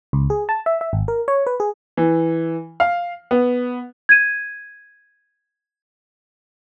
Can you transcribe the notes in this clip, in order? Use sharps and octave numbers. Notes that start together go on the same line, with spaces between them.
C#2
G#4
A5
E5
E5
G#1
A#4
C#5
B4
G#4
E3
F5
B3
G#6 D#7